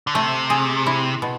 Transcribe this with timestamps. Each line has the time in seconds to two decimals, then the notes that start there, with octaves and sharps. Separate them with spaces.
0.07 D3
0.14 C3 A3
0.50 G#4
0.86 E4
1.22 B2